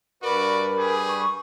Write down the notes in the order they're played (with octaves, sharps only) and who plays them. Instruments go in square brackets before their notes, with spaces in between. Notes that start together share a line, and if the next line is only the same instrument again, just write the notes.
[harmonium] G2 B4 [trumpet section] F#4 D5 [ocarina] A#4
[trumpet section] G3 G#4
[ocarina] C#6